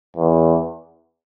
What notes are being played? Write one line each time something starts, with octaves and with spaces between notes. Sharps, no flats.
E2